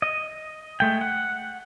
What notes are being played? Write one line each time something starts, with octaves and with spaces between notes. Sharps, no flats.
D#5
G#3 A3 G5
F#5